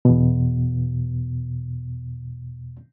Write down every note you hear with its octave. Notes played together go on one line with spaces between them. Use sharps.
E2 B2